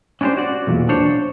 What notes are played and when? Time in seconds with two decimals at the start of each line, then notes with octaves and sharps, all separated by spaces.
0.21 C#4 D4 E4 G4 C5
0.37 F#4 D5
0.67 B1 E2 A#2
0.89 D4 C5 C#5